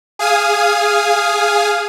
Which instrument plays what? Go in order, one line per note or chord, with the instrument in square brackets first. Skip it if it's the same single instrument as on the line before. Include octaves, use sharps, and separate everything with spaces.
[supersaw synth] G#4 F5 G#5 D#6